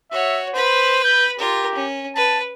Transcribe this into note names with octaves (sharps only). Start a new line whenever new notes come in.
F#4 C#5 E5
B4 C5 B5
G6
F4 G4 A#4
C#4
B4 A5